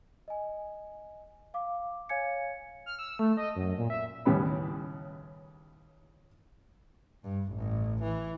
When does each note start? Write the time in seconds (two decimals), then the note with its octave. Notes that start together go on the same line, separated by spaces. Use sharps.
0.28 D#5 G#5
1.54 F5 D6
2.09 C#5 F5 G#5 G#6 C#7
2.86 F6
2.99 E6
3.19 A3
3.37 D#5
3.56 F#2
3.78 A#2
3.90 E5
4.25 D#2 A2 C#3 G3 B3 B5
7.23 G2
7.52 A1
8.03 E3